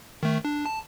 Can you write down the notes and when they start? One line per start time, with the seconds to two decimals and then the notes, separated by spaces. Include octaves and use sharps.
0.23 D#3 A3
0.45 D4
0.66 A5